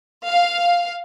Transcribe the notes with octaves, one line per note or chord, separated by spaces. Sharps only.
F5